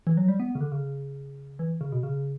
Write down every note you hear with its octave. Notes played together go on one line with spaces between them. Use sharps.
E3
F#3
G3
B3
C#3
D3
C#3
E3
C#3
B2
C#3